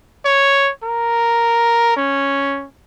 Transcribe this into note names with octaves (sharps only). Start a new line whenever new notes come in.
C#5
A#4
C#4